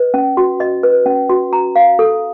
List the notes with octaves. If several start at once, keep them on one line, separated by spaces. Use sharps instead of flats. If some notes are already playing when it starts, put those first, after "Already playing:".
Already playing: B4 D#5
C#4
F#4
D#5
B4
C#4
F#4
A#5
F5
A4